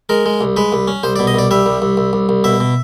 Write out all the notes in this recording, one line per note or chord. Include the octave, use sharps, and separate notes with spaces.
G#3 A#4
G#3
C2
G#3 B4
C2
C#4
C2 C5
D5
B2
D#5
C2 D5
G3 E5
C2
C2
C2
C2
C2
B2 E5
B2